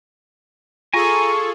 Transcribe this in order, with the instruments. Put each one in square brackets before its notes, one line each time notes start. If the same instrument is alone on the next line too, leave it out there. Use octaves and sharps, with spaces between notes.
[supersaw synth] F4 G#4 A4 [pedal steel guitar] G#5 A#5 [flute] C#6